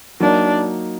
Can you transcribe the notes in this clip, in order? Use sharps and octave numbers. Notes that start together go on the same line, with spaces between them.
F#3 A#3 D4 D#4